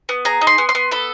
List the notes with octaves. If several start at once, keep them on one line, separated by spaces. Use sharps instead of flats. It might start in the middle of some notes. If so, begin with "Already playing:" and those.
B3
G#4 A#5
D#4
C6
B3
C6
B3
A4 B5